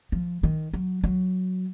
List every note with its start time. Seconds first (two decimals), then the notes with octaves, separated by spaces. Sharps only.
0.12 F3
0.43 D#3
0.74 F#3
1.04 F#3